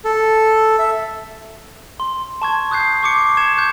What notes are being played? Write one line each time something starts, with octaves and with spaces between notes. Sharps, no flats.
A4
E5
C6
A5 C#6 G#6
D#6 F#6 G6 C7
C#6 D6 C#7
C#6 G#6 E7
C#6 F#6 G6